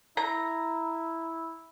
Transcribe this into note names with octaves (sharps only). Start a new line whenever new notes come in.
E4 A#5